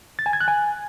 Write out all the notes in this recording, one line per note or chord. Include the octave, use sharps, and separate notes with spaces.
A6
G#5
G#6
F#6
G#5